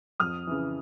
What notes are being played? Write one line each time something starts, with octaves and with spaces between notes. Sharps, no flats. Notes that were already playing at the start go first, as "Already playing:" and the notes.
F2 D#6 F6
C#3 E3